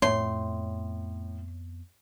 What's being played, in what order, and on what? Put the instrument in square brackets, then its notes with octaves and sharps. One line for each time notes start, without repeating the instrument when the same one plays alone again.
[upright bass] F2 B3 [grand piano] A2 [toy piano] C#5 [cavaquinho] C6